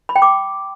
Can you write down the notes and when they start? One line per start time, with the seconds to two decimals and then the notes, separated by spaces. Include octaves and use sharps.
0.09 B5
0.16 G5
0.22 D6